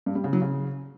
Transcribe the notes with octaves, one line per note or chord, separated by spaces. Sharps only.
G2
G3
C#3
F#3
C#3